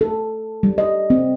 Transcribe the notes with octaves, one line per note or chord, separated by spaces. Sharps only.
A4
G3
D#5
C4